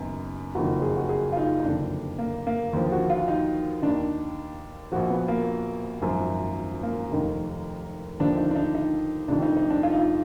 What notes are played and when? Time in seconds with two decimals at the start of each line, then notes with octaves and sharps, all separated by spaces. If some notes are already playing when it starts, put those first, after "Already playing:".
Already playing: F#1 F#2 D#3 B3
0.55 F#1 F2 D#3 F#4
0.82 G#4
0.96 F#4
1.09 G#4
1.32 F4
1.37 D#4
1.60 D#4
1.65 F#1 F2 D3 D4
2.19 A#3
2.47 A#3
2.73 D#2 D3 F3
2.92 F#4
3.10 F4
3.28 D#4
3.82 D#2 D#3 D4
4.92 A#1 A#2 F3 F#4
5.10 B3
5.28 A#3
6.01 G#1 F#2 F3
6.83 A#3
7.11 F1 D#2 D#3
8.20 D#2 D3 F3 D4
8.37 D#4
8.51 D4
8.56 D#4
8.75 D#4
9.28 F1 F2 D#3 D4
9.42 D#4
9.57 D#4
9.70 D4
9.83 F4
9.91 D#4
9.98 F4